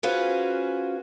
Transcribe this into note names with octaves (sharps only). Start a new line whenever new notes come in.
C#4 F4 F#4 G#4 B4 C5